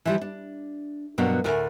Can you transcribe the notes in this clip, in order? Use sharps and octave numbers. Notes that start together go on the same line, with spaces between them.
E3 F3 G3
D4
G2 B2 F#3 A#3 B3 D4
D2 A2 A#4 G#5